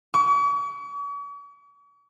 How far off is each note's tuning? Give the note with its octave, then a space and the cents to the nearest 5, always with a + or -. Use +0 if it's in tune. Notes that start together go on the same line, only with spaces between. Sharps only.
C#6 +45